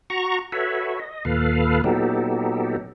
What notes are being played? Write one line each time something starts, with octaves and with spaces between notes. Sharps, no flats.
F#4 A#5 C#6
F#4 A4 B4 C#5 E5
D#5
D#2 A#2 A4 B4 F5
A#2 F#3 B3 D#4 G4 A4